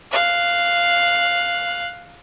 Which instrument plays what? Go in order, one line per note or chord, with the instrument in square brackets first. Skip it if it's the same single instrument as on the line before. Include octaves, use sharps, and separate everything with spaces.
[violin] F5 F#6